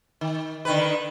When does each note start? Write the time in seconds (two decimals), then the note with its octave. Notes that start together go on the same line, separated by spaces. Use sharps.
0.21 D#3
0.65 D3 D#3 B4